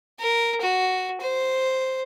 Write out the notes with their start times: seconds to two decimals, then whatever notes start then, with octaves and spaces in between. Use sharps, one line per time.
0.19 A#4
0.61 F#4
1.21 C5